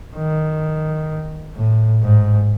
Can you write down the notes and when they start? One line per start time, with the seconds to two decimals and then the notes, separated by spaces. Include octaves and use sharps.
0.16 D#3
1.55 A2
2.03 G#2